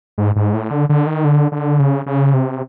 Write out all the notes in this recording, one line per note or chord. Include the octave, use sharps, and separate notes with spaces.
G#2
G#2
A2
D3
D3
D#3
D3
D3
C#3
C#3
C3